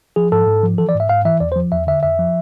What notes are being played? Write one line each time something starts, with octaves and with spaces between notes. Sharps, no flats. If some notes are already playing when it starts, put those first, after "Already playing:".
F3 G#4
G#2 A4
G#2
F3
E3 A4
D5
G#2
E5
G#2 F5
E3 E5
E2 D5
C5
F3
E2 E5
D3 E5
F2 E5
F3